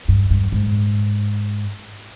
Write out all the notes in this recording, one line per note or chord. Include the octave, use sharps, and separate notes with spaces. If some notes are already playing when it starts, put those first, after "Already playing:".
G2
G2
G#2